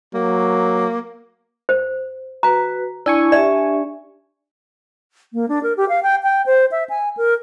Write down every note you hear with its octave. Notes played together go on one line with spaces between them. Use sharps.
F#3 A#3
C5
F#4 B4 A#5
D4 E4 G#5 C#6
G4 D5 E5
A#3
D4
A#4
G4
F5
G5
G5
C5
E5
G#5
A#4